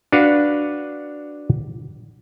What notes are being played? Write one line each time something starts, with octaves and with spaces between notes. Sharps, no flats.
D4 F#4 B4 F5 F#5